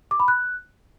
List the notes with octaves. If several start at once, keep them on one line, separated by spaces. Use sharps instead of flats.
D6
B5
F#6